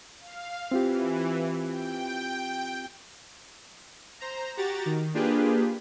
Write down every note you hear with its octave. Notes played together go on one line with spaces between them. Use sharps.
F5
E3 C4 F4 G4
G5
C5 A#5
F#4 G4 A#5 A6
D#3
A#3 D4 F4 G4 G#4 B4